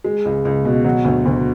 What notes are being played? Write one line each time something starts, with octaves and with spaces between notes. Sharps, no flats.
G#3
C#2
C#2
B2
F#3
D2
D2